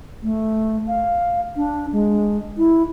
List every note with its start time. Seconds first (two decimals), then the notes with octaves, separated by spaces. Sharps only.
0.23 A3
0.88 F5
1.56 D4
1.92 G#3
2.58 E4